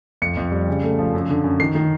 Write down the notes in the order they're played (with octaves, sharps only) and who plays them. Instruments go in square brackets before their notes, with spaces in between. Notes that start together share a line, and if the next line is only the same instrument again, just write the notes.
[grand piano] F2 C#7
F2
G3
C#3
A3
F3
F#2
D3
F#2
D#3 C7
D#3